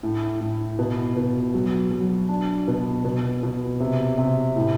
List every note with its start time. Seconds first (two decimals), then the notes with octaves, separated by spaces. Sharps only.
0.03 A2
0.41 A2
0.79 B2
1.16 B2
1.54 F#3
1.91 F#3
2.29 D4
2.68 B2
3.05 B2
3.43 B2
3.80 C3
4.18 C3
4.56 A2